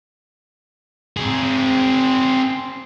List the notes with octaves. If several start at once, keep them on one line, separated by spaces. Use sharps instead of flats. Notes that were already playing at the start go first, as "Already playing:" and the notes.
C4 G#4